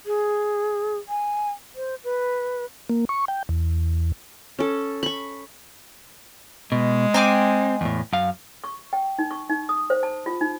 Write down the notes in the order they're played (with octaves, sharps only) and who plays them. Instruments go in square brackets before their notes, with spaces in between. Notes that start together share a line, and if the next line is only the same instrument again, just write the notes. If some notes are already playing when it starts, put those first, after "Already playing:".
[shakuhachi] G#4
G#5
C5
B4
[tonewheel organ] A#3
C#6
G5
E2
[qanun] C#4 A4
B5 C#6
[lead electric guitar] B2 [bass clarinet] G#3
[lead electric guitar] C4 [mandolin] G5 G#5 D6
[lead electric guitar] E2 A2
F#2 F5
[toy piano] C#6
G5
D#4
C#6
D#4
D#6
C5
A5
F4
D#4